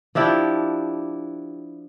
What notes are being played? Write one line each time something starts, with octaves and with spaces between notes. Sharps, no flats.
F3 D4 E4 G4